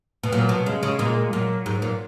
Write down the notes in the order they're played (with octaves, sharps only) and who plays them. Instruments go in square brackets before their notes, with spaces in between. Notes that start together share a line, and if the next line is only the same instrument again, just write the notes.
[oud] B2
[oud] A#2 [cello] F#3
[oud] B2
[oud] C#3 [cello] G#3
[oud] C#3
[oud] A#2 [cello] G#3
[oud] A#2 [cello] F#3
[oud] G#2
A#2